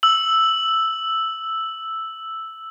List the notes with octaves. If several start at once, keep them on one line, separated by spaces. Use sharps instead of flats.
E6 F#7